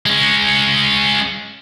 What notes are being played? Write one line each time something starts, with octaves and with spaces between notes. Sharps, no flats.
G#3 C#4